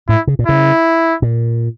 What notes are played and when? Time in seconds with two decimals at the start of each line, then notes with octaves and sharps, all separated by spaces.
0.09 A2 E4
0.27 C#3
0.39 A#2
0.47 C#3 E4
1.22 A#2